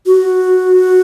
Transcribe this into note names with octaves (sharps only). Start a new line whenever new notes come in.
F#4